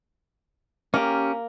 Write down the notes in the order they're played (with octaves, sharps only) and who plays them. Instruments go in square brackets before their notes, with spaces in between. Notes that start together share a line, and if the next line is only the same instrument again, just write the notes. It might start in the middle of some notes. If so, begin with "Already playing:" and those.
[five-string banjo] A#3 [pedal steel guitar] C#4 G4